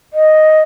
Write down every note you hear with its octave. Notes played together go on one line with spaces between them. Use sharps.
D#5